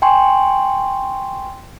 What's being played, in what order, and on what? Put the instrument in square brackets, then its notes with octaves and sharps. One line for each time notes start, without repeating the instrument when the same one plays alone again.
[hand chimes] G5 G#5 C6 C#6